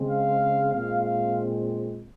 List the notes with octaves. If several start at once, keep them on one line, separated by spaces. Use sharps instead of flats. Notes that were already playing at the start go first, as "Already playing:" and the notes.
Already playing: C#3 G#3 C4
F5
A#2 G#3 C4 F5
F5